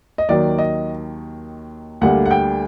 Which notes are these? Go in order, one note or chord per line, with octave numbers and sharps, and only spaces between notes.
D#5
D#2 D#3 F#3 D5
D#5
D2 D3 G3 A#3 F#5
F#5
G5